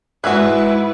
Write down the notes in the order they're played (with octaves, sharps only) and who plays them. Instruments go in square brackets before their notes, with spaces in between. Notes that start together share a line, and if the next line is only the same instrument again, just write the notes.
[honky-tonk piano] G#2 E5 F#6 [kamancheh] E4 B4 [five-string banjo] F#4 G#4